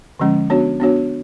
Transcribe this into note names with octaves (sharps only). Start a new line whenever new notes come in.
D3 F3 G#3 C#4
B3 D4 F#4 C#5
B3 D4 F#4 C#5